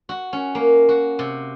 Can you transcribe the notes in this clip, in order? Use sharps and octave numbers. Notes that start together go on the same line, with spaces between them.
F#4
C#4
A#3
F#4
C3